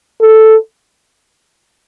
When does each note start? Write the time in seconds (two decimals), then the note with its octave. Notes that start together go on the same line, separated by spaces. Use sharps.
0.21 A4